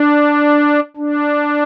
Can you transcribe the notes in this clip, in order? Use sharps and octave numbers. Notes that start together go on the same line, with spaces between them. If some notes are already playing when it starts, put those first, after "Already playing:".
Already playing: D4
D4